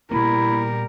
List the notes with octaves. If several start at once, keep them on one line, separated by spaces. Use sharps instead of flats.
A#2 G3 A#3 B3 E4 A#4